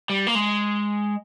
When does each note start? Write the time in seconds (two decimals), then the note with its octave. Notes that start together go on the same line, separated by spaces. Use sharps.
0.10 G3
0.27 A#3
0.35 G#3